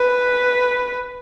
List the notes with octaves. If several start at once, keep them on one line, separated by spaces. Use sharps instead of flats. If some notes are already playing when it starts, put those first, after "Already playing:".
Already playing: B4